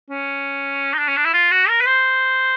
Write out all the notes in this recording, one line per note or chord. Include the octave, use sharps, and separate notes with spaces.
C#4
D#4
D4
C#4
D4
E4
F4
F#4
A#4
B4
C5